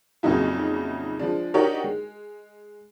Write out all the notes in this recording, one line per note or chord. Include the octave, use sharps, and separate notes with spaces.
F2 A#2 C#3 F#3 D#4 E4
F3 G#3 D4
D4 D#4 F#4 G4 A#4 C#5
G#3